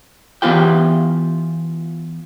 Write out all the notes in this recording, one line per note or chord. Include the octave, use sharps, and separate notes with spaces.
E3 B3 E4 F4 G4 G5